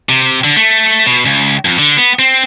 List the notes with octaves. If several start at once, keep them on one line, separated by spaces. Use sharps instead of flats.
C3
D3
A3
B2
C#2
F2
D3
B3
C4